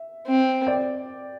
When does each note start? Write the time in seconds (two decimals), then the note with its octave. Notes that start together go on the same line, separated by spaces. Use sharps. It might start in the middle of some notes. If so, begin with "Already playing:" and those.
Already playing: E5
0.26 C4
0.67 D5 G5